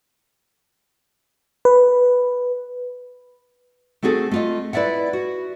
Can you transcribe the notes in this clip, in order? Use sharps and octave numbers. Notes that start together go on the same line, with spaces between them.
B4
A3 C4 F#4 G#4 A4
A3 F4 D#5
E4 B4 D5 E5 F#5
F#4